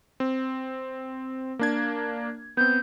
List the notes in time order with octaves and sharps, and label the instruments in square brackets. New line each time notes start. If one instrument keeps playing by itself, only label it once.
[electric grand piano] C4
A#3 D4 G#6
[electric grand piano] B3 C4 [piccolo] G6